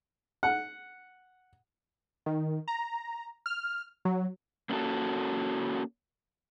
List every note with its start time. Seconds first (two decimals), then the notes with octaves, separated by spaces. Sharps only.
0.43 F#5
2.26 D#3
2.68 A#5
3.46 F6
4.05 F#3
4.70 A#3 C#4 D4 E4 F#4 A4